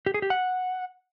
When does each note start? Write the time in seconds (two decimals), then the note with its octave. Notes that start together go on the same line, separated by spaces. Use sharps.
0.06 G4
0.14 G#4
0.22 G4
0.30 F#5